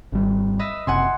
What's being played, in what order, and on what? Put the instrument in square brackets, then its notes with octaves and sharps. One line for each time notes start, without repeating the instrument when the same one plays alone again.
[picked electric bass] G#1 G3
[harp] B4 D#5 E5
[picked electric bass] F#1 C3 [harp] F#5 G#5 C6